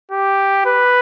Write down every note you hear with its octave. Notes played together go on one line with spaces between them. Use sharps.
G4
B4